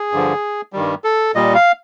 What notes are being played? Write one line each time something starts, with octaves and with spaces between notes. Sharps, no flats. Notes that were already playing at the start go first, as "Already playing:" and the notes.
Already playing: G#4
G2 D3 F3
G2 D#3 G3
A4
A#2 G3 D#5
F5